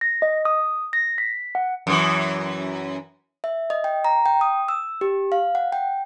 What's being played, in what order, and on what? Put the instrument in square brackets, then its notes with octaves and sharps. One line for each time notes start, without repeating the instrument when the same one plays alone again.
[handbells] A#6
D#5
D#6
A#6
B6
F#5
[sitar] F#2 E3
[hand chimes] E5
D#5
G5
A#5
G5
D#6
E6
G4
F5
F#5
G5